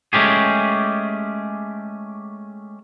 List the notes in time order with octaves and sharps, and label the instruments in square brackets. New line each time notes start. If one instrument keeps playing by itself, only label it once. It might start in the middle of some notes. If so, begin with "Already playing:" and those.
[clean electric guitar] G#3 A3 C#4 G4 G#4